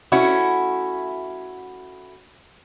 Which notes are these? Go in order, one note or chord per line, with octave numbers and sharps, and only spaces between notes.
A3 C#4 E4 F#4